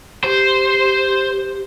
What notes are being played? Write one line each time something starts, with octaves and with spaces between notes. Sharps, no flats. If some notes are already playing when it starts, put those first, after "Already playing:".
G4 C5